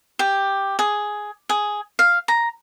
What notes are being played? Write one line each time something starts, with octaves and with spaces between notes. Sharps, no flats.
G4
G#4
G#4
F5
A#5